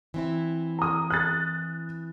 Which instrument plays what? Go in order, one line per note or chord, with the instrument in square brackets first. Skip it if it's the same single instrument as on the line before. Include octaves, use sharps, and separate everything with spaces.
[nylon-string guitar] E3 C4 E4
[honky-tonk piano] A#5 D#6
F#6 A6